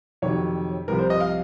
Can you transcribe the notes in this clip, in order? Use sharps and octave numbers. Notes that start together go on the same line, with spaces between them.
F2 C3 D#3 F#3 C#5
C2 C3 F3 A#4
C5
D#5
F5